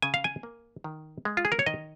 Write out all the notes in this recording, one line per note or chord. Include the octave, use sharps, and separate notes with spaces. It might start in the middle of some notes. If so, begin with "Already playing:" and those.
C#3 G#5
F5
G#5
A#3
D#3
G#3
F4
G#4
A#4
C#5
D#3 D#5